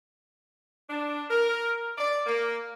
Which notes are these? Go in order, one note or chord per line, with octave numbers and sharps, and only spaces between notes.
D4
A#4
D5
A#3